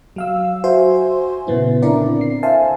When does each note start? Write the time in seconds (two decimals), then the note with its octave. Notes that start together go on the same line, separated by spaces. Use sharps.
0.16 F#3 F5 E6
0.64 F#4 C5 E5 G#5 C6
1.47 A#2 C#3 B3 E4
1.82 D3 C4 D4 E4 A#4 D5
2.21 C7
2.43 A4 C5 E5 F5 G#5 A5